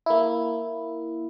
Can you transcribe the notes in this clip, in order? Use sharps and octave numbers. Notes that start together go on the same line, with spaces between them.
A#3 E4